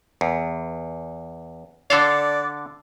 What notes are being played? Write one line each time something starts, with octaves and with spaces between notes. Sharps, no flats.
E2
D3 A4 D5 F5